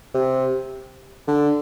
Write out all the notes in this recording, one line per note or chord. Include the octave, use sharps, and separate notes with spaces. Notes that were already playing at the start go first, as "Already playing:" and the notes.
C3
D3